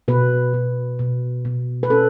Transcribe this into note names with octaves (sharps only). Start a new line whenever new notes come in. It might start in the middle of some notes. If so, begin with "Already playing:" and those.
B2 B4
B2
B2
B2
B4
C#4 A4